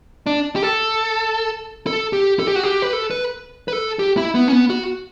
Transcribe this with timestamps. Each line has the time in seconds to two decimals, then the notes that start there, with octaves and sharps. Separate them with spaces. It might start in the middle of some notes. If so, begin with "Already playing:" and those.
0.27 D4
0.56 G4
0.63 A4
1.87 A4
2.13 G4
2.39 A4
2.48 G4
2.56 F#4
2.64 G4
2.82 B4
2.93 A4
3.10 B4
3.68 B4
3.73 A4
3.99 G4
4.17 E4
4.35 B3
4.48 C#4
4.52 B3
4.70 F#4